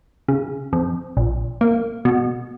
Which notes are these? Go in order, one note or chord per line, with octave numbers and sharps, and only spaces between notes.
C#3
F2
A#1
A#3
B2